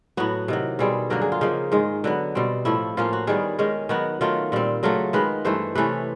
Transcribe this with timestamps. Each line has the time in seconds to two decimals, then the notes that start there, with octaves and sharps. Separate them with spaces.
0.17 A2 F#3 B3 F#4
0.48 C3 D#3 F#3
0.79 B2 G3 C4 G#4
1.10 G2 D3 F#3 A#3 A#4
1.21 G#4
1.32 F4
1.41 C#3 F3 A#3 D#4
1.72 G#2 D#3 G#3
2.04 D3 F#3 B3
2.35 B2 G3 C4
2.65 A2 F3 A3 E4
2.97 A2 F3 A#3 C#4 F4
3.13 F#4
3.27 D#3 G3 B3 G#4
3.59 D#3 G#3 C#4
3.89 D#3 F#3 B3 F#4
4.21 D#3 F#3 A3 F4
4.52 A#2 G3 C4
4.83 C#3 F#3 A3 F4
5.13 D#3 G#3 B3 B4
5.45 G2 E3 A3 C5
5.75 C3 E3 A3 C#4 B4